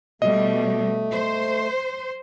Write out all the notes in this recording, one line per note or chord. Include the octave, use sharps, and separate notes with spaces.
B2 G3 A3 D#5
C5